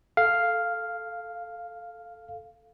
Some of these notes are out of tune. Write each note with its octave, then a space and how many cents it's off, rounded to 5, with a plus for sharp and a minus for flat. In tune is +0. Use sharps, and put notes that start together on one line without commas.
A4 +0 F5 +0